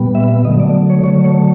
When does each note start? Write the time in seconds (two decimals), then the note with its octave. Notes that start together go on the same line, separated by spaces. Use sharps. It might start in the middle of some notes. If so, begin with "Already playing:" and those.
Already playing: A#2 G3 B3
0.15 E5
0.45 D3 F#3 A3 D#5
0.60 D5
0.90 C#5
1.04 D3 F#3 A3 C#5
1.24 C#5